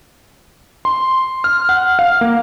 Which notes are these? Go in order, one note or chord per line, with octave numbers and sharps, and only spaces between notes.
C6
F6
F#5
F5
A#3